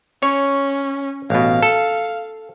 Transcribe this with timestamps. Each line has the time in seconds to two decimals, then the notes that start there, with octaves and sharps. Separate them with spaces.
0.23 C#4 C#5
1.30 A1 B2 F5
1.63 A4